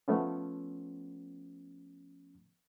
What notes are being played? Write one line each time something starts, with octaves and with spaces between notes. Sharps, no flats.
F3 A3 B3 C#4